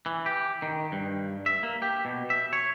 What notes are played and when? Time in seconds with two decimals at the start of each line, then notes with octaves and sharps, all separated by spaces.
0.06 E3
0.26 G4
0.62 D#3
0.92 G2
1.46 E5
1.63 A#3
1.82 G4
2.05 B2
2.30 E5
2.53 C#5